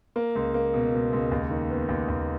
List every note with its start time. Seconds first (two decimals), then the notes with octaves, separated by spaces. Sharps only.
0.16 A#3
0.35 C#2
0.54 A#3
0.74 B2
0.93 B2
1.12 C#2
1.31 D#2
1.51 D#3
1.70 B3
1.89 D#2
2.08 D#2